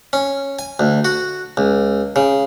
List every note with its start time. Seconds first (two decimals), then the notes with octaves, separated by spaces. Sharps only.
0.13 C#4
0.59 G#5
0.80 D2
1.05 F#4
1.57 C#2
2.16 C#3